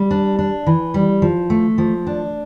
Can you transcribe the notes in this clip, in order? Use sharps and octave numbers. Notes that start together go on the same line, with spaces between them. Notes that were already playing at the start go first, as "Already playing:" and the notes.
Already playing: G3
D4
D4
E3
G3
F3
A3
F3
D4